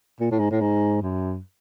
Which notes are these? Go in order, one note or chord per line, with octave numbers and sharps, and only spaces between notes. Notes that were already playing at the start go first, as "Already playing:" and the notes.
A#2
A2
G#2
A2
G#2
F#2